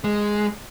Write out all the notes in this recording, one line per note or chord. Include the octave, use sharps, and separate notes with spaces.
G#3